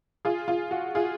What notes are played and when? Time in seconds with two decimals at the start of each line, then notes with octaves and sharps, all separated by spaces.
0.25 F4 G#4
0.48 F4
0.71 F#4
0.95 F4 G#4